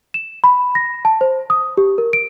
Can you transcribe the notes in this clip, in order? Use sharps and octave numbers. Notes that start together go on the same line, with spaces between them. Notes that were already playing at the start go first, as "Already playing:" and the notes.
E7
B5
A#6
A5
C5
D#6
G4
A#4
D7